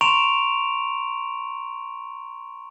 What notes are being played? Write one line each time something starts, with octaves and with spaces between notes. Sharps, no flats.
A#5 C6 C#6 D7 E7 F7